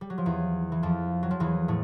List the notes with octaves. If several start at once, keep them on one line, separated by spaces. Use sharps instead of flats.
G3
F#3
F3
E2 E3
E3
F2 F3
F#3
F3
E2 E3
A2 A3